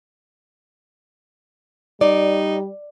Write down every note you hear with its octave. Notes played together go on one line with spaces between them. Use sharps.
G3 D#4 D5